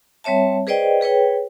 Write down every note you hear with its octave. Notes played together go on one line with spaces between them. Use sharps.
G3 C4 C#5 E5 A5
G#4 B4 C5 D5 D#5 G5
G#4 B4 C#5 G5